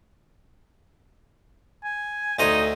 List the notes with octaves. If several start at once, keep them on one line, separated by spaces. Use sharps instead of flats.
G#5
D2 D#4 C5 D#5